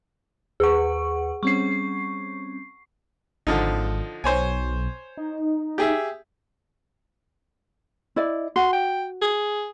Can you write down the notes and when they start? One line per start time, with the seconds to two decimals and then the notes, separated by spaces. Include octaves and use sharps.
0.60 D#2 G#4 B4 F#5 C#6
1.43 G3 C4 C#4 C#6 C7
3.47 G#1 D3 F3 D#4
4.24 B1 C5 C#5 G#5
5.17 D#4
5.78 G4 G#4 E5
8.16 E4 D5 D#5
8.56 F#4 C6
8.73 G5
9.22 G#4